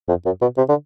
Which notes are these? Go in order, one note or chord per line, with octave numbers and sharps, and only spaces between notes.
F2
F#2
B2
C3
D3